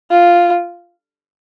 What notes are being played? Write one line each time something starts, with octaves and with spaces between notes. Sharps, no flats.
F4